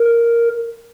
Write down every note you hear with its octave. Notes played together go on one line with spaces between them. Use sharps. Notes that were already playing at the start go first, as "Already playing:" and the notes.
Already playing: A#4